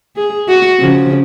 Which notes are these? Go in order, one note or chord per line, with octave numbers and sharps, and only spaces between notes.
G#4
F#4
C#3 F3